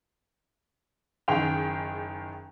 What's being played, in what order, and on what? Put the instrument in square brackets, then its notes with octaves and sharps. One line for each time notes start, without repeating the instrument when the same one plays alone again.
[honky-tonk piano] F#1 D#3 G#4 G5 F7